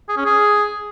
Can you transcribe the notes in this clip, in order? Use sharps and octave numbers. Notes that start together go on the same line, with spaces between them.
G#4
C#4
G#4